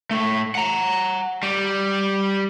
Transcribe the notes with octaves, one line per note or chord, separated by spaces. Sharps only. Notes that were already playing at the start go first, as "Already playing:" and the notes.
A2 A3
F#5 A#5
G3